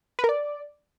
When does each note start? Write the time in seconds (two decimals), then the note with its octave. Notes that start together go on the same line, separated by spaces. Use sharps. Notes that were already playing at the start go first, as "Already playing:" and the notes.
0.19 B4
0.24 A#4
0.29 D5